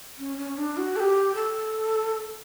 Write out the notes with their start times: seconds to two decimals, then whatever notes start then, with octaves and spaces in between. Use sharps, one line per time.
0.18 C#4
0.37 C#4
0.58 D4
0.77 F#4
0.96 A4
1.00 G4
1.35 A4